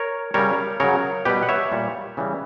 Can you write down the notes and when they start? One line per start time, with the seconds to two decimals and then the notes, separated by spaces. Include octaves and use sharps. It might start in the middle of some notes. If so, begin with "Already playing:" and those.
Already playing: A#4 C#5
0.34 C#3 G3 A#4 C#5
0.80 C#3 F#3 A#4 C#5
1.25 B2 G3 G4 B4
1.43 F#5
1.49 C#5 E5
1.72 A#2 G3
2.17 C#3 E3 G3